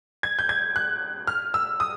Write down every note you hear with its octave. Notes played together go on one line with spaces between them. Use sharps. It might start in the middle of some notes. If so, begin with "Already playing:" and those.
G#6
G6
G#6
F#6
F6
E6
D#6